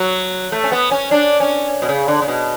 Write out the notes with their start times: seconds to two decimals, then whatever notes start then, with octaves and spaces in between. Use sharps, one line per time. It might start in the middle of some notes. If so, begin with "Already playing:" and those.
Already playing: F#3
0.52 A3
0.64 C#4
0.72 B3
0.91 C#4
1.11 D4
1.40 C#4
1.82 B2
1.89 C#3
2.08 D3
2.22 C#3
2.28 B2